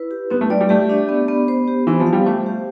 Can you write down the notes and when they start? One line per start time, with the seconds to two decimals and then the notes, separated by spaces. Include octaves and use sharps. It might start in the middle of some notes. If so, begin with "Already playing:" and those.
Already playing: E4 B4
0.11 G4
0.30 B3 C4
0.41 A3
0.50 G3 D5
0.61 G3
0.69 A3 G4
0.89 D4
1.09 B3
1.28 B3
1.48 C5
1.68 G4
1.87 E3 C4
2.00 F3
2.07 F5
2.13 G3
2.26 A3 C5
2.46 G4